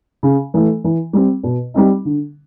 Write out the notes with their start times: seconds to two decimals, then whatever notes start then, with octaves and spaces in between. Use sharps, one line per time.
0.23 C#3
0.54 E3 A3
0.84 E3
1.13 G3 C4
1.43 B2
1.74 G3 C4 D#4
2.05 D3